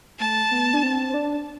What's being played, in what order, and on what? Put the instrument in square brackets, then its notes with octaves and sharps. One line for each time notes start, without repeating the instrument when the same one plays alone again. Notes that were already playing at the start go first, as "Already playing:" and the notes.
[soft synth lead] A3 [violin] A5
[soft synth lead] B3
D4
C4
C4
D4